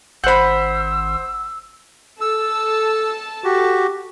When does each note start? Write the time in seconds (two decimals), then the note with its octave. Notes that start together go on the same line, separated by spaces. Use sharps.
0.24 G#1 C5 F#5 B5 E6 G6
2.21 A4 A5 E6
3.44 F#4 G4